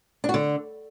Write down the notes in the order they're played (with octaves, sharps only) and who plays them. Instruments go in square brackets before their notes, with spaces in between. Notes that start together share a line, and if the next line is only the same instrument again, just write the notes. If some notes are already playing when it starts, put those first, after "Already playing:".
[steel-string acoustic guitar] D4
F#4
D3